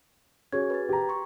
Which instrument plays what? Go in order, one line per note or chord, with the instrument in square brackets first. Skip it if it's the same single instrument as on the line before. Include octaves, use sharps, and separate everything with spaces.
[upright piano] C#4 [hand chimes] F#4 G#4 G#6
[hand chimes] B4 G#6 A6
[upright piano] G4 A#5
[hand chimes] C6 C#6